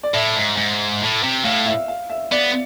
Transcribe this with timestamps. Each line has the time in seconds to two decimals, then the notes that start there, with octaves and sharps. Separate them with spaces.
0.03 D5
0.14 A2 E5
0.36 G#2
0.57 G#2
1.02 A2
1.23 C3
1.44 A2 F5
1.66 E5
1.88 F5
2.10 E5
2.32 B3 D5